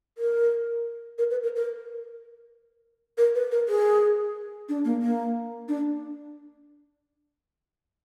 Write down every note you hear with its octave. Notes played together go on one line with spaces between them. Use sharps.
A#4
A#4
B4
A#4
A#4
A#4
B4
A#4
G#4
D4
A#3
A#3
D4